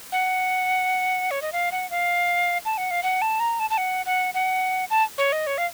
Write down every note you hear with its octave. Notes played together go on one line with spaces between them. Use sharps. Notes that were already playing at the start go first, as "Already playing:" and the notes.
F#5
C#5
D#5
F5
F#5
F5
A5
F#5
F5
F#5
A5
A#5
A5
A5
F#5
F#5
F#5
A5
C#5
D#5
C#5
F5